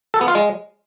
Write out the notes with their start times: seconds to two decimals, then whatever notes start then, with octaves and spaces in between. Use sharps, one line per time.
0.14 A4
0.21 B3
0.28 F4
0.35 G#3